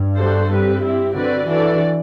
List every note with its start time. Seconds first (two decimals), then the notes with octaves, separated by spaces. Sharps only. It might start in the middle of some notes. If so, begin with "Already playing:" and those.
Already playing: G2
0.17 G3 D4 F#4 A4 C5
0.49 G3 C4 G4 B4
0.82 C4 E4 G4
1.14 D3 C4 F#4 B4 D5
1.46 E3 D4 F#4 A4 D5